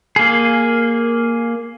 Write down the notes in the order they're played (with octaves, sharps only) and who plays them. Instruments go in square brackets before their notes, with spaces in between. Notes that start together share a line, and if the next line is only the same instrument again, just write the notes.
[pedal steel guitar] A#3 G#4